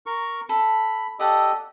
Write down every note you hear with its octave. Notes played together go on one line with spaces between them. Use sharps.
A#4 C#6
A4 B5
G4 A4 D5 D#5 F#5 A5